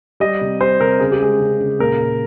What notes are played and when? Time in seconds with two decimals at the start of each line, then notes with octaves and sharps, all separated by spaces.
0.20 G3 D#5
0.41 C3
0.61 G3 C5
0.80 C3 A#4
1.00 C#3 G#4
1.11 G4
1.21 G#3 G#4
1.40 C#3
1.61 C#3
1.79 A#2 A#4
2.00 A#2